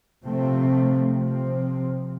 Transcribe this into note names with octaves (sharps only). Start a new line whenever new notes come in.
C3 F3 A3 C4
C3 F3 C4